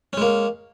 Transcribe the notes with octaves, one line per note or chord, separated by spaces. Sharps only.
G#3 A#3 C#4